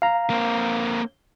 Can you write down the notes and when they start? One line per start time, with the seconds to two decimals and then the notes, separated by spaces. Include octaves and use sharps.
0.02 F5 A#5
0.30 A#3 C4